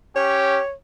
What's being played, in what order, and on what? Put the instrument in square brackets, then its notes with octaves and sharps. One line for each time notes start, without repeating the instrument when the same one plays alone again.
[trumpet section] C#4 G4 [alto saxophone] C#5